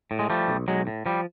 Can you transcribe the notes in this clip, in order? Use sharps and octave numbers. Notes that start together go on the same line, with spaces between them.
A2
G#3
F3 G3 A3
B1
B1 F#3 G#3
A2
F3 G3